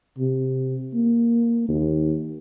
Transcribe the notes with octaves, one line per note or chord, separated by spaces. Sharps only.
C3
A#3
D#2